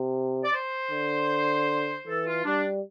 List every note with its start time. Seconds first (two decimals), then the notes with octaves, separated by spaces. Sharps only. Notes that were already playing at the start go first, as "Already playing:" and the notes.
Already playing: C3
0.44 D5
0.54 C5
0.91 D3
2.07 E3 A4
2.26 F4
2.45 G3 D4